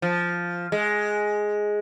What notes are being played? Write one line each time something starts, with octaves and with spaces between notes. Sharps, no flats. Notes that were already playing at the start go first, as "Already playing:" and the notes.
F3
G#3